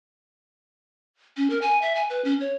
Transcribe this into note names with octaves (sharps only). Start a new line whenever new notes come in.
C#4
A#4
G#5
E5
G#5
B4
C#4
C#5